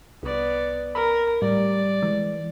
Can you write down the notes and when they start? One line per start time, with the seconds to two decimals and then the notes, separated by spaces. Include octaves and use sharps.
0.23 C2 B3 D5
0.95 A#4 B5
1.42 A2 G3 D5
2.02 E3 G#3